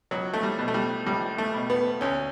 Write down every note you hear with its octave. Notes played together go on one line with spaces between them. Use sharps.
C#2 F#3
A3
G3
B2
A3
G3
C#2 G3
A3
B2
B3
D2 C#4